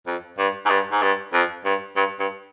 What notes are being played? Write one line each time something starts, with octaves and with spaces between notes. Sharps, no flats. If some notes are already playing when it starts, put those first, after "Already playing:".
F2
G2
G#2
G2
G#2
G2
F2
G2
G2
G2